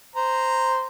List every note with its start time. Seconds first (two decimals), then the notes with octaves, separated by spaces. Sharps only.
0.16 C5 A#5